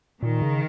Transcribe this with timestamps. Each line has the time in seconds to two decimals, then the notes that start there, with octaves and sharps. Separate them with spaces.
0.22 A#2 D#3
0.42 C#3